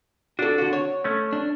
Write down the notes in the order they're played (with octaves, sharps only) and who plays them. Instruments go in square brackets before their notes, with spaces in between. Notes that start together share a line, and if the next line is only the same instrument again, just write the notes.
[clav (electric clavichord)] D4 [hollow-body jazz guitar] F#4 A4
[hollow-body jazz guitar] D3 F#4
C#5
[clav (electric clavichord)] A3 C#4
[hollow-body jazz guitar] D4